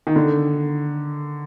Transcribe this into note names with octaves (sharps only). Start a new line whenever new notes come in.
D#3
D3